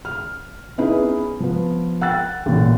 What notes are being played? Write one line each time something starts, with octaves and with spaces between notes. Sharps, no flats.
F6
B3 C#4 D#4 E4 G#4 B4
F3 B3
F#5 G5 E6 F#6 A6
A1 A#2